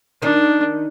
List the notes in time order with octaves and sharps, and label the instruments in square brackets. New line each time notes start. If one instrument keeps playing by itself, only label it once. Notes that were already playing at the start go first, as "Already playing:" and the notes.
[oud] D#3 D#4 [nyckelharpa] D4